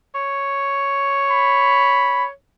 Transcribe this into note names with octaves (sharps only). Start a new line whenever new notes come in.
C#5
B5